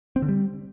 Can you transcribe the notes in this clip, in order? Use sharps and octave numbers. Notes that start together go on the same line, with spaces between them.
C4
D3
G3